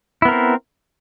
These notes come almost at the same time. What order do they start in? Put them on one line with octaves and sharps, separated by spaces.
E4 B3 A#4 C4